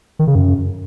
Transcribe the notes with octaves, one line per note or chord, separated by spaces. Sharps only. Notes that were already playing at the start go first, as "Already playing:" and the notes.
D#3
C#3
F#2